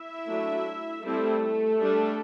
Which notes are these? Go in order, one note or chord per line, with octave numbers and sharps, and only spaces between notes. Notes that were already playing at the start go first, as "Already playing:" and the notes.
Already playing: E4 E5
F#3 A3 D4
G3 A3 C4 E4 A4
G3 D4